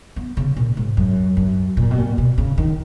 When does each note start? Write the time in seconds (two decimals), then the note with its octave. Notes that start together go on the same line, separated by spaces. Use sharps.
0.16 B3
0.37 C#3
0.57 A#2
0.77 G#2
0.97 F#2
1.37 F#2
1.77 A#2
1.91 B2
1.98 A#2
2.18 B2
2.38 C#3
2.58 D#3